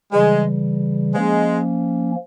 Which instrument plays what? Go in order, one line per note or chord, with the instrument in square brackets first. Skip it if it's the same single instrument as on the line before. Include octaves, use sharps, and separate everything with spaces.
[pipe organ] C#3 E3 G3 [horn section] G#3
[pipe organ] F3 A#3 C#4 [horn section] G#3